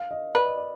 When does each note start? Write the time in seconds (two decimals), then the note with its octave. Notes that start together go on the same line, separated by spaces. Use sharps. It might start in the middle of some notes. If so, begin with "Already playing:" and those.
Already playing: F5
0.11 D#5
0.35 B4 D5
0.46 D#5
0.57 D5